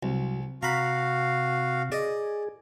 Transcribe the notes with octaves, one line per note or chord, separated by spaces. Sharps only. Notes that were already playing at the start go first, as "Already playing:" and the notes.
C2 F#3
C3 F#4 F5 A#5 B5
G#4 D5 D#5